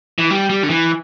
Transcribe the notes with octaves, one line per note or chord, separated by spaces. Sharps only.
E3
G3
G3
D3
E3